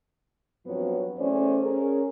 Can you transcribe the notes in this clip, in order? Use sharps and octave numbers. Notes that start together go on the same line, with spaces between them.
G2 F3 F#3 B3 C4 C#5
E2 A3 C#4 C5 D5
C#4 G#4 A#4